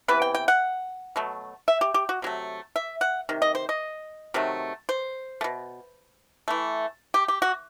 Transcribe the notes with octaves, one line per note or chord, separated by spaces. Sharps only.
C3 E3 B3 B4
G5
G5
F#5
B2 F#3 A3
E5
G4
G4
F#4
C3 F#3 A3
E5
F#5
C3 D#3
D#5
C5
D#5
C3 D#3 F#3 A3
C5
A3
B2
E3 A3
G4
G4
F#4